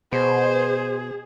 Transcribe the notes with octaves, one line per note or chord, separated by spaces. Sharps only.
B2 G#4 C5